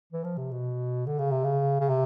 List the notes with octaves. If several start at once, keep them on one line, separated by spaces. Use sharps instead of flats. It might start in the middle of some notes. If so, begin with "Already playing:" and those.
E3
F3
C3
B2
D3
C#3
C3
C#3
C#3
C3